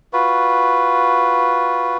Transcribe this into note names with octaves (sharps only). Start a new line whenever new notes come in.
F4 F#4 B4